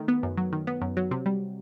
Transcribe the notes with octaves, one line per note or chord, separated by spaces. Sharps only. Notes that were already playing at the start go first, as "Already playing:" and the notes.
Already playing: D#3 A3
B3
F#2
F#3
D#3
B3
F#2
F#3
C3
G3